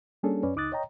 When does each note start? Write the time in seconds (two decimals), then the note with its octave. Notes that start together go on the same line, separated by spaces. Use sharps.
0.23 G3 A#3 C#4 D4 G#4 A4
0.43 F#2 C#4 B4 D5
0.56 C#2 D#4 D6 D#6 F#6 A6
0.72 C#5 D#5 G5 A#5